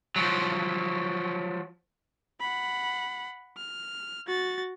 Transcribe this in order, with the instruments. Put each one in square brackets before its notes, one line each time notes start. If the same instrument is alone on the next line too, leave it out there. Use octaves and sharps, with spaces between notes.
[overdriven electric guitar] F3 F#3
[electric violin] F#5 B5
F6
F#4 A6